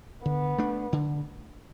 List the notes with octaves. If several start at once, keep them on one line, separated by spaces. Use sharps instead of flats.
D3 B3
A3 D4
D3